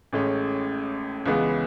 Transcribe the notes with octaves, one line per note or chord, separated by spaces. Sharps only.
A1 A2 G#3 C#4
C#2 C#3 E3 G#3 B3